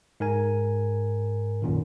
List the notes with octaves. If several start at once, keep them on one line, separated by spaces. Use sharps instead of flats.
G#2 A#4 G#5
B1 F#2 A#2 D#3